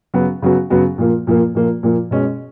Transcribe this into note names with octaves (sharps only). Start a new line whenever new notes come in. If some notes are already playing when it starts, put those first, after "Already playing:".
C#3 F#3 B3 F#4
C#3 F#3 B3 F#4
C#3 F#3 B3 F#4
A#2 F3 A#3
A#2 F3 A#3
A#2 F3 A#3
A#2 F3 A#3
B2 G#3 C#4